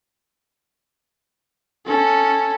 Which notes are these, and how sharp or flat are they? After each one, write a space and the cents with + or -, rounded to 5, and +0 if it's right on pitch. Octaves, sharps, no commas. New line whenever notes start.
C#4 +0 A4 +0